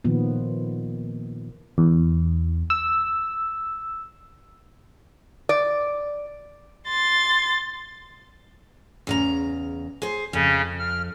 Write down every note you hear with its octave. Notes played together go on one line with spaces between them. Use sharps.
A#2 D#3 F3 B3
E2
E6
D5
C6 A6
E2 C#3 A#5
G#4 C5
F2 C#3 C#4
F6